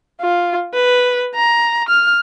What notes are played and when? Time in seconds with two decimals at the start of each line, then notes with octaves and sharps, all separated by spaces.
0.20 F4
0.74 B4
1.35 A#5
1.89 F6